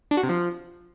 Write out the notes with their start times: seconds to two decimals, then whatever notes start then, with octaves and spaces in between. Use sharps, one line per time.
0.11 D4
0.17 F#4
0.23 C3
0.29 F3